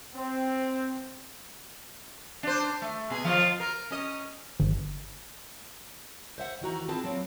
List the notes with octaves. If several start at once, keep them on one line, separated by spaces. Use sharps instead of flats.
C4
D4 C5
A3
B2 G#4
F3 F4 D#5
A#4
C#4 D#5
G1
C5 E5 F#5
D#3 E3 F#4 A#5
C4 F4 G#4 B4 A5
F#3 A#3 C4